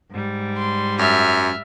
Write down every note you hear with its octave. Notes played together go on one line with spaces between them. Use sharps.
G#2 G3
C6
F#2 E5 F6